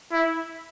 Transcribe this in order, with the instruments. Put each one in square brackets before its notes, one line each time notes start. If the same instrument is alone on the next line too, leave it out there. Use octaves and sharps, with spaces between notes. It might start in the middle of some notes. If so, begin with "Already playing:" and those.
[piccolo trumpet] E4